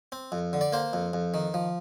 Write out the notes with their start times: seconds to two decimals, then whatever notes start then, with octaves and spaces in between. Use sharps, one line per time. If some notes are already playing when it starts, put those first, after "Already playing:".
0.12 C4
0.32 F2
0.53 D3
0.61 D5
0.73 A#3 C5
0.93 F2
1.13 F2
1.34 D#3
1.54 F3